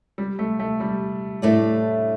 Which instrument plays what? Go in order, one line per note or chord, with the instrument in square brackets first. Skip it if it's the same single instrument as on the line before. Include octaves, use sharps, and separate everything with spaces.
[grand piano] G3
A3
A3
G3
[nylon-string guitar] A2 A3 D4 A4 D5